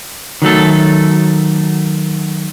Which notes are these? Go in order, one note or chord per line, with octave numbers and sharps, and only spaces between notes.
D#3 F#3 A3 A4